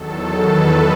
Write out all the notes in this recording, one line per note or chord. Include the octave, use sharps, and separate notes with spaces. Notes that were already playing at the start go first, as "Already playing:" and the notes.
Already playing: E2 D#3 F#3 A4
B4